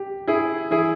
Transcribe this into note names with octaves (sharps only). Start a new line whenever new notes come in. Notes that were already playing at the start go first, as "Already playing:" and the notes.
Already playing: G4
E4 G#4
E3 E4 G#4